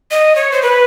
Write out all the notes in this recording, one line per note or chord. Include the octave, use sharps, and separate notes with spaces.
D#5
C#5
C5
B4